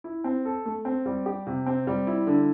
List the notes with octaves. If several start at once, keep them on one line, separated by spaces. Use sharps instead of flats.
E4
C4
A4
A3
C4
G3
G4
C3
C4
G3
E4
D3